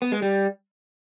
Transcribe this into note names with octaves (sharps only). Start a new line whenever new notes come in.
B3
G#3
G3